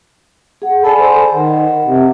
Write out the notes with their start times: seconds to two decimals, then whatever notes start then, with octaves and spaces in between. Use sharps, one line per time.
0.62 G#4 F#5
0.83 A4 D5 G#5 B5
1.00 C5
1.32 D#3 F#5
1.85 C3